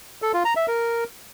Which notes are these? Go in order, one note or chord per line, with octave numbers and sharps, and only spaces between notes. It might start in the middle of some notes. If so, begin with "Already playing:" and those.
A4
F4
A#5
E5
A#4